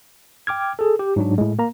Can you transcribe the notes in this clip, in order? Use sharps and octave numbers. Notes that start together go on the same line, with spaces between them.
G5 D6 F6 G#6
G#4 A4
G4
G#2 F#3 D4
A2 G#3
A#3 A#5